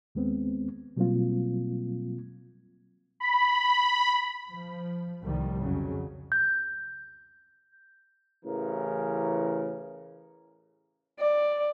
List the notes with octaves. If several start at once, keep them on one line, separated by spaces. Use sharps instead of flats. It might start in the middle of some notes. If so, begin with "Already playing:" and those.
D#2 G#3 B3 C4
B2 F#3 G3 A#3 C4 F4
B5
F3
C2 A2 D#3 F3 G3
F2 C#3 F#3
G6
A1 C#3 E3 A#4
D5